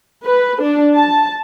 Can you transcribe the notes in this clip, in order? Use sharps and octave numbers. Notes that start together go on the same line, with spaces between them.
B4
D4
A5